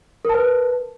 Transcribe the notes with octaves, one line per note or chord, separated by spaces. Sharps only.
A#4 B4 A5